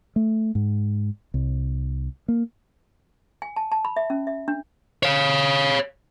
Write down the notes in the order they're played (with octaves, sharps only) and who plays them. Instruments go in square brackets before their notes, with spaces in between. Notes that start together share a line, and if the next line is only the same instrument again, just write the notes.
[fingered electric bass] A3
G#2
C2
A#3
[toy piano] G#5
A5
A5
B5
E5
C#4
E5
D4
[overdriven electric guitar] C#5 F5